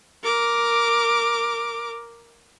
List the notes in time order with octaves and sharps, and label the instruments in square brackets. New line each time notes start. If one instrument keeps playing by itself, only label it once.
[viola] A#4 D6